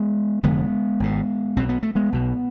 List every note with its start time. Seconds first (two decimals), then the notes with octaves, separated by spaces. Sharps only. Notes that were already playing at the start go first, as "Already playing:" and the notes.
Already playing: G#3 B3
0.43 F1 F2 D3 G#3 B3
1.00 G#1 G#2
1.56 B1 B2 C4
1.69 B3
1.83 A3
1.95 G#3 B3
2.12 B1 B2